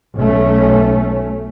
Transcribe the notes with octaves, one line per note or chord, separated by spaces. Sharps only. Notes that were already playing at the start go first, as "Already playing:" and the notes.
B1 A3 C#4